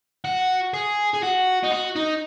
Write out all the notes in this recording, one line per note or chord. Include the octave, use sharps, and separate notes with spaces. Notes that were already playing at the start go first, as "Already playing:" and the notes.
F#4
G#4
G#4
F#4
D#4
F#4
D#4